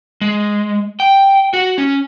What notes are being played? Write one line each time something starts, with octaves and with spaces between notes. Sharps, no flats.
G#3
G5
F#4
C#4